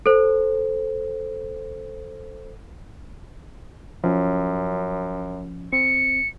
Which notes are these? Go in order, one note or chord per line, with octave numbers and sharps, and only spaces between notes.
A4 C5
F#2 F3 C#4
C4 C#7